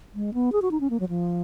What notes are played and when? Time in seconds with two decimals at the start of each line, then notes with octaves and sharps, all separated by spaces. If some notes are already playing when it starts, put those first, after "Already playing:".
0.15 G#3
0.34 B3
0.52 G#4
0.62 F#4
0.71 D#4
0.80 C#4
0.90 A#3
1.00 F#3
1.09 F3